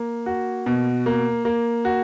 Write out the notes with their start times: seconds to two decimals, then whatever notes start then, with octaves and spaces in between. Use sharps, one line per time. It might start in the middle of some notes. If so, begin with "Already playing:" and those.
Already playing: A#3
0.26 F#4
0.66 B2
1.06 A#3
1.45 A#3
1.85 F#4